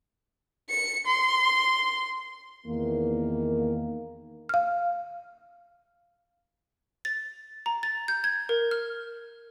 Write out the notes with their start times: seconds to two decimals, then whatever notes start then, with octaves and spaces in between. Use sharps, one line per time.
0.70 C#7
1.07 C6
2.66 E2 D#3 A#3
4.49 F5 F6
7.05 A6
7.66 A#5
7.83 A6
8.08 G6
8.24 G#6
8.49 A#4
8.71 F6